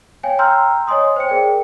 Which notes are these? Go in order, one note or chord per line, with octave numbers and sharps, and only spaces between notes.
C#5 F5 G5 G#5
G5 A#5 C6 E6 F6 G6
C#5 D#5 G#5 C6 D#6
C5 G5 C#7
G#4 A#4 D5 G5